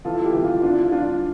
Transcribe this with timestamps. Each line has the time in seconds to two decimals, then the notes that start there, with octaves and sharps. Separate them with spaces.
0.05 E3 F4 A4
0.20 A4
0.24 E4 G4
0.34 E3
0.44 F4
0.63 D4 F4
0.92 D4 F4